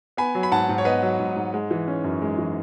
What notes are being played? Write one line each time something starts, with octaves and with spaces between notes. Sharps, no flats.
B3 G#5 B5
F#3
B5
G#2 F#5 A5
G#2
C#5
B3 B4 D#5
F#3
G#2
G#2
G#3
E3
C#4
F#2
G#3
E3